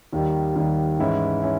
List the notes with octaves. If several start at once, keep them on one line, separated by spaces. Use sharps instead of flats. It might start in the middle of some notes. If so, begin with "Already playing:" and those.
D#2 D#3 G3
D#2 D#3 G3
G#2 E3 G#3 C#4 E4
C#4 E4